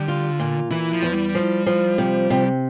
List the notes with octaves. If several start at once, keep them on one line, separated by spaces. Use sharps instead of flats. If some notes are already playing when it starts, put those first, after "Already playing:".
Already playing: D3 G3
F4
A#2
E3 E4
F3
E2
G3
F3
F3
C3
C3